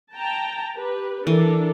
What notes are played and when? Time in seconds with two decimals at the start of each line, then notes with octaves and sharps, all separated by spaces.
0.13 G5 A5 A#5
0.74 G4 B4
1.27 E3 D4 A4 A#4